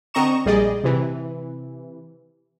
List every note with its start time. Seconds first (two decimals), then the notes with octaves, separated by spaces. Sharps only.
0.14 D3 C4 D#5 A#5 C#6 E7
0.45 A#1 G3 G#4 D5 D#5
0.84 C3 E3